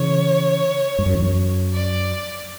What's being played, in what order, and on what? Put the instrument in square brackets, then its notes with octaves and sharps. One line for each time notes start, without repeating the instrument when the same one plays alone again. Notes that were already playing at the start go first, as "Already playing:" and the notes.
Already playing: [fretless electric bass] C#3 E3 [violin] C#5
[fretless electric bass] G2
F#2
E2
F#2
[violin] D5